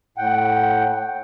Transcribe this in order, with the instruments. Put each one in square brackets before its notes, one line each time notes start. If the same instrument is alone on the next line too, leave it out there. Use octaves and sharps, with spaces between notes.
[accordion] A2 F#5 G5